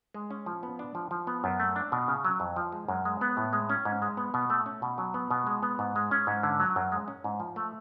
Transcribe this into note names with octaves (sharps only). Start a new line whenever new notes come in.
G#3
C#4
F3
B3
D4
F3
F3
B3
F#2
A3
D4
B2
C#3
F#3
F2
F3
G#3
F#2
G#3
B3
A2
G#3
C#4
G#2
G#3
B3
B2
A3
C#4
B2
F#3
B3
B2
G#3
B3
G#2
G#3
C#4
G#2
D3
F#3
F#2
G#3
C#4
G#2
F3
A3